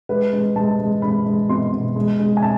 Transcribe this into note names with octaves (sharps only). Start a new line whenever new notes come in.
G#3 B4
G#3
G#3 A5
G#3
G#3 B5
G#3
B2 C6
B2
G#3
G#3
G#5
A5